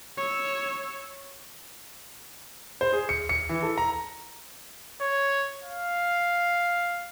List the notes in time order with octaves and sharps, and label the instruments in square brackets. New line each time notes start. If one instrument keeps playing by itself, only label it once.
[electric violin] C#5 E6
[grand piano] C5
G#4
C#7
C#7
E3
A4
A#5
[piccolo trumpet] C#5
F5